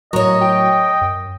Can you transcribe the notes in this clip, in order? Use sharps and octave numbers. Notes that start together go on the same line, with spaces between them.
A2 F#3 F#4 A#4 C#5 D#5
G5
F#2